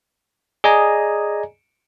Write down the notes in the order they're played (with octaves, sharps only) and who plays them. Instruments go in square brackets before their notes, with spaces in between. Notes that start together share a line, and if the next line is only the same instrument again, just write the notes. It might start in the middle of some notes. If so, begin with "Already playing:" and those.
[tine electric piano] G#4 D5 D#5 G#5 A#5